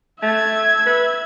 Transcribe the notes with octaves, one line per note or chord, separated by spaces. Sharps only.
A3 E5 G#6
B4